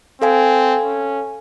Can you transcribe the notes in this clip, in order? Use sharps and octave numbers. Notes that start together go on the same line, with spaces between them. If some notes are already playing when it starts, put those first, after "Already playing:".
C4 A4 F5 G#5
C#4